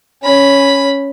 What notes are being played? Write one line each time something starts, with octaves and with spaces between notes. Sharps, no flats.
C#4 B5